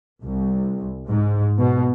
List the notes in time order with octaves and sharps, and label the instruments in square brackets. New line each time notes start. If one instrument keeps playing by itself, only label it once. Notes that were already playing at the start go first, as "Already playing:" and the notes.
[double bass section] C2
G#2
B2